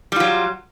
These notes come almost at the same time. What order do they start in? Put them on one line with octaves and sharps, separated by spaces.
G3 F4 F#3